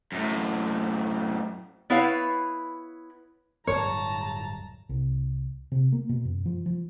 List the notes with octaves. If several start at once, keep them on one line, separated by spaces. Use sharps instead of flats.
F#2 A2
B3 E4 B4 C#5 F5
D1 G2 F#3 C#5 A5 A#5
C2
C3
A#3
B2
F#2
F3
F3